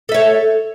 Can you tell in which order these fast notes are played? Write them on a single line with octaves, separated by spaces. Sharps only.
A4 E5 C#5